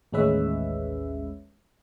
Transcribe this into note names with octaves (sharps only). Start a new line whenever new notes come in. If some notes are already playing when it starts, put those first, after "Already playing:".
A1 D#2 G#3 C#4 B4 E5